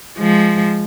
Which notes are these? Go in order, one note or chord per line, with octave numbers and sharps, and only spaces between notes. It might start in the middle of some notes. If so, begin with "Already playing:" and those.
F3 G#3